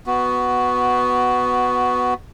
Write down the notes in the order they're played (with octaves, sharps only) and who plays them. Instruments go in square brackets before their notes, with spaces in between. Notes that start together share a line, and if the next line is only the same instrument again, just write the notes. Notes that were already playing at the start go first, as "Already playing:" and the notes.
[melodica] B3 F#4